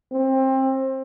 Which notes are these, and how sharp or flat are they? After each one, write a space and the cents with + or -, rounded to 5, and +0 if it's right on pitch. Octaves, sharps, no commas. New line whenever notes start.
C4 +25